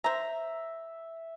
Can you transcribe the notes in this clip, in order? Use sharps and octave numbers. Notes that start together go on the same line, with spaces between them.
C5 E5 A#5